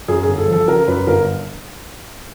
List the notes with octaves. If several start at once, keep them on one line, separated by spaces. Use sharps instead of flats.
F#2 G#4
G#4
G1
A4
F3 A4
C#3 A#4
F#2 B4
G1 A#4